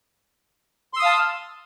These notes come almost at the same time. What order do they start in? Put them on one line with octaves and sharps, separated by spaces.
C6 E6 D#6 F5 A5